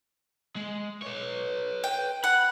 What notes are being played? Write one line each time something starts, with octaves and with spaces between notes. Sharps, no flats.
G#3
B4 C#5
G5
F#5 B5